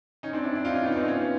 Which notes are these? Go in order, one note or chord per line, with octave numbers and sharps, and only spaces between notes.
C#4 D#4
C4 D4
D4 E4
D4 E4
D#4 F4
C#4 D#4
B3 C#4
D#4
C4 D4
B3 C#4